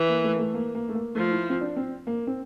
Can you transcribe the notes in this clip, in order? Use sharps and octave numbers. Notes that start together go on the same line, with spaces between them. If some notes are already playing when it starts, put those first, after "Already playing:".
Already playing: E3
A#3
A3
A#3
A3
A#3
A#3
A3
A#3
F3 A3
E4
C4
D4
C4
A#3
C4